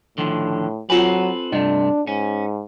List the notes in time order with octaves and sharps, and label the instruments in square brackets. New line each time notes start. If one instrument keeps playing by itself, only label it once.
[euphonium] A2 [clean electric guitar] D3 D#3 F3
[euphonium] F#3 [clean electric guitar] C4 A4 B4 [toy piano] F4 G#5
[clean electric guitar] G2 C3 A3 [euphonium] D4 [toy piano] D#5
[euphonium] G#2 [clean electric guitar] C#4